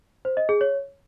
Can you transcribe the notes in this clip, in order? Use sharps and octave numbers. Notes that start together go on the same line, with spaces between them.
C5
D#5
G#4
C#5